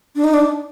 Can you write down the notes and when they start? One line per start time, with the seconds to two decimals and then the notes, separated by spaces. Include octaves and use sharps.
0.16 D4
0.24 D#4
0.34 D4